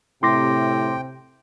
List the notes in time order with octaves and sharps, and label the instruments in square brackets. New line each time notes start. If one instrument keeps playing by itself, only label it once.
[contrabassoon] A2 [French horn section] C3 [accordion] G5 [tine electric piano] C6 D6 A#6